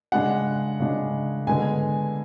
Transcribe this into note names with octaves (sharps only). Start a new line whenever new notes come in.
C#3 G#3 D4 F#5
C#3 G#3 D4
D3 G#3 B3 G#5